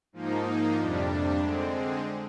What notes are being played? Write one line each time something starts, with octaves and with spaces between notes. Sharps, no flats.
G#2 F3 A#3 D#4
F2 C3 G3 D4
D3 G#3 C4